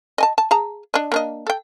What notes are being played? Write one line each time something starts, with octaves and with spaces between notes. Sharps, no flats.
D#5 G#5 A5
A5
G#4 A5 A#5
D4 D#5
A#3 D4 D#5
A4 G5